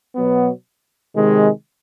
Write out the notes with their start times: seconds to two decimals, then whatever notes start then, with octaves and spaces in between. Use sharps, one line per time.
0.15 B2 F#3 B3
1.14 C3 D#3 G#3